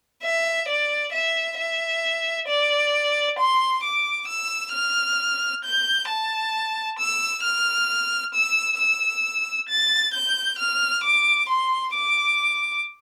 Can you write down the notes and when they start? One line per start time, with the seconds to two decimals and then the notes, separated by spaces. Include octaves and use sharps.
0.23 E5
0.68 D5
1.13 E5
1.58 E5
2.48 D5
3.38 C6
3.83 D6
4.27 E6
4.73 F6
5.64 G6
6.08 A5
6.98 E6
7.43 F6
8.34 E6
8.78 E6
9.69 A6
10.14 G6
10.58 F6
11.04 D6
11.49 C6
11.94 D6